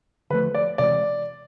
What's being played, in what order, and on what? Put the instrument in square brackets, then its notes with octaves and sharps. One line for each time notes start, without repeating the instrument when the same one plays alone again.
[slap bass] D3 F3 A3 [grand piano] B4
[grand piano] D5
[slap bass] C3 E3 G#3 [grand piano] D5